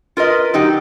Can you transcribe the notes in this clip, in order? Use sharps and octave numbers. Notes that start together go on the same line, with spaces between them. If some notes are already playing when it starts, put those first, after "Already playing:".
F4 A#4 B4 D#5
D3 F#3 D#4 G4